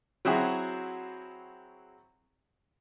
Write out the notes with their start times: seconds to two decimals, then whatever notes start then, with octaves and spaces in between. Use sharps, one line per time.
0.25 F#3 C4 E4 F#4 G#4